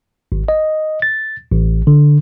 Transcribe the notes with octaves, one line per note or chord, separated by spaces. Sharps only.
G#1
D#5
A6
A1
D3